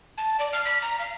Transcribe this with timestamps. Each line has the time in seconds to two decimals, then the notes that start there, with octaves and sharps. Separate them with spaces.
0.18 A5
0.39 D5
0.53 F6
0.65 B6
0.82 A#5
0.99 F5